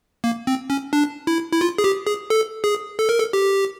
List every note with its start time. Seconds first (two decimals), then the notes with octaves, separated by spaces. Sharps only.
0.24 A#3
0.47 C4
0.70 C#4
0.93 D4
1.27 E4
1.53 E4
1.61 F4
1.78 G#4
1.84 G4
2.07 G#4
2.30 A4
2.64 G#4
2.99 A4
3.09 A#4
3.19 A4
3.33 G4